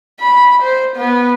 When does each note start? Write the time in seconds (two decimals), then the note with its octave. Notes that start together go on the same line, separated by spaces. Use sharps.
0.20 B5
0.62 C5
0.96 B3